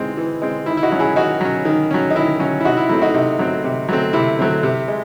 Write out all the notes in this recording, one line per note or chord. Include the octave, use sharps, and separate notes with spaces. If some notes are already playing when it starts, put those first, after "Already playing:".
Already playing: E3 G#3 C4 D#4
E3
G#3 C4
D#3 E4
E4
D#4 F#4
F#3 C#4
E4 G#4
D#3 D#4 F#4
F#3 C#4
D#3
F#3 C#4
D#4
D#3 E4
F#3 C#4
E4
C3 D#4 F#4
E4
F#3 A3 C4 E4
D#4 F#4
C3 D#4
F#3 A3 C4
C3
F#3 A3 C4
C3 E4
F#3 A3 C4
C3
G#3